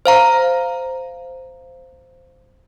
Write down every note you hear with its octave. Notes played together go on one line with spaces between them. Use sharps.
C5 F5 A#5